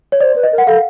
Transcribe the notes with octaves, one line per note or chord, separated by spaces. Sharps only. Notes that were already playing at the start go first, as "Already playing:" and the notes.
C#5
C5 D5
B4
D#5
A#4
F#5
A4 F5